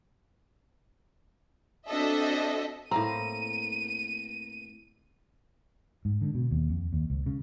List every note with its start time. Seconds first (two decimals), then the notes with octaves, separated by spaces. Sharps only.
1.88 C4 D4 F#4 A4 D#5 E5
2.91 A2 A#3 C4 A#5 D#7
6.05 G#2
6.21 D3
6.35 B2
6.51 D#2
6.70 F2
6.93 D#2
7.10 C#2
7.26 C#3